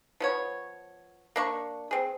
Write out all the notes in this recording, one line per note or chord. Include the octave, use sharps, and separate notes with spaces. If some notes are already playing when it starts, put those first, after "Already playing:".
F3 B3 C#5
A#3 D4 C#6
C4 G#4